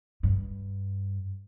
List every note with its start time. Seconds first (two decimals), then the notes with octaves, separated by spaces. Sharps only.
0.23 G2